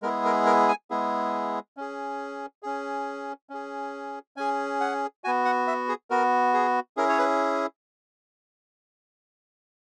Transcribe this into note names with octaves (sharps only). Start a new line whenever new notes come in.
G#3 B3 E4 G#4 A#4
A#4
A#4
G#5
G#3 B3 E4 G#4
C#4 G#4
C#4 G#4
C#4 G#4
C#4 G#4 G#5
F#5
B3 F#4 G#5
F#5
E5
G#4
B3 F#4 A#4
G#4
C#4 E4 G#4 A#4
C#5
B4